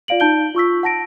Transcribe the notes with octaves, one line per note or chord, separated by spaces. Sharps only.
F4 D5 F5 D7 F#7
D#4 A5 G6 D7 G7
F4 C#6 E6 B6
F#5 A5 A#6 D7